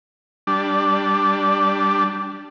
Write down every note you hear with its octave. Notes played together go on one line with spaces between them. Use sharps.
G3 D4